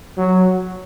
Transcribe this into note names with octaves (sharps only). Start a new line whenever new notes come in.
F#3